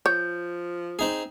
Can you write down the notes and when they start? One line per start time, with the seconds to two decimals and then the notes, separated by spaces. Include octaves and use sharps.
0.06 F3 C#5 G6
0.99 C4 D#4 G#4